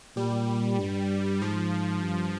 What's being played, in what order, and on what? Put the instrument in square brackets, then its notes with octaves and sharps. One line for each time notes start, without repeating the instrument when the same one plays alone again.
[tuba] A#2 [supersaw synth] G3
[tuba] G2
[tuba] G#2 [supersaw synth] F3
[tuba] G2